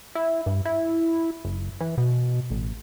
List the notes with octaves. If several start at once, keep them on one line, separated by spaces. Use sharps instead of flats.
E4
G2
E4
F#1
E3
B2
A1